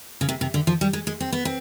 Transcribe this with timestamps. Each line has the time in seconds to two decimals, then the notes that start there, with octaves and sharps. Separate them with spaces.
0.21 C#3
0.29 C3
0.41 C3
0.54 D3
0.67 F3
0.81 G3
0.93 G#3
1.07 G#3
1.21 C4
1.32 B3
1.45 C4